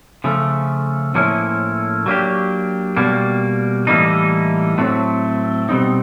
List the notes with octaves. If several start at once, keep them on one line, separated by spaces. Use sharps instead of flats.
C#3 F3 A3
A2 F3 A#3 C#4 E4
F#3 A#3 D4 G4
B2 G3 A#3
A2 E3 G3 A#3 D#4
A2 F#3 A3 C4
B2 G3 C4 D#4